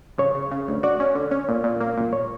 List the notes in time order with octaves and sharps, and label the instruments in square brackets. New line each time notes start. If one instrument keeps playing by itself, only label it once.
[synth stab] C#3 [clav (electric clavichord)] C#5
[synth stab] C#3
C#3
D2
[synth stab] F#4 [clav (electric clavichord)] D5
[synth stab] C#4
D3
C#4
A#2
A#2
A#3
A#2
[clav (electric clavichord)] C#5